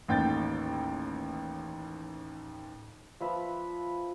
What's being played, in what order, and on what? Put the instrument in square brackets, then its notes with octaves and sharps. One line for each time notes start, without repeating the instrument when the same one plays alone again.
[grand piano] A1 D#2 G5 G6 A6
[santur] F3 B4 E5